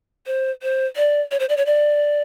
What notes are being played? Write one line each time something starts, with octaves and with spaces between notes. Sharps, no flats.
C5
C5
D5
C#5
C5
D5
C#5
D5